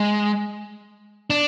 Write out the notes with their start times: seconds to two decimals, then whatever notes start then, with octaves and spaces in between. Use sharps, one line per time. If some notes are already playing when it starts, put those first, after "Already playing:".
Already playing: G#3
1.30 D4